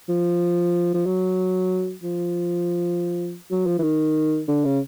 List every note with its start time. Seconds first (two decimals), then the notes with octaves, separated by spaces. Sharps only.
0.09 F3
0.94 F3
1.06 F#3
2.03 F3
3.51 F#3
3.67 F3
3.79 E3
3.83 D#3
4.48 D3
4.65 C#3